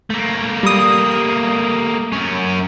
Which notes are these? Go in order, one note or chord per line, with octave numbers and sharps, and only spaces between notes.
A3 A#3
G3 D#6
F#2 C#4